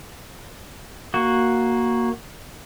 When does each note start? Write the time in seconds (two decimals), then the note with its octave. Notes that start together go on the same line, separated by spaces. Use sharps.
1.14 A#3 F#4